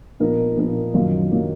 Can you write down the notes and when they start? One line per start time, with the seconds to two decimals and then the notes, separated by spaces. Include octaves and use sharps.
0.20 A#2 F3 B3 D#4 A#4
0.57 A#2 F3 B3 D#4 A#4
0.94 F#2 D#3 F#3 A#3 F4
1.31 D#3 F#3 A#3 F4